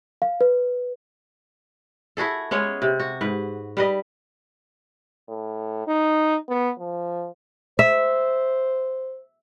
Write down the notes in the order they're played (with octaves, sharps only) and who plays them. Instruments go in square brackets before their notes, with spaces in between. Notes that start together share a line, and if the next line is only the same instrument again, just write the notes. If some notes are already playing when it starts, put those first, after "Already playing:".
[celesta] F5
B4
[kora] E4 F#4 G#4 A4
G#3 B3 C#4 C#5
C3
F#4
G#2 B4
G3 B4 D#5
[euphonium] A2
D#4
B3
F3
[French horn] C5 [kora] E5